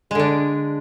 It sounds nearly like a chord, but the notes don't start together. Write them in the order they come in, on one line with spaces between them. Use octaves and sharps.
G#3 D3 D4